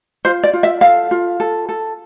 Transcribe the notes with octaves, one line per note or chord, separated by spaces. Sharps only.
F4 C5
D5
F4
E5
A4 F5
F4
A4
A4